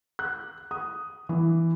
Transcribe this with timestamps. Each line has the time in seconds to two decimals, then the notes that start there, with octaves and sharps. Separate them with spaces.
0.19 F#6
0.71 D#6
1.29 E3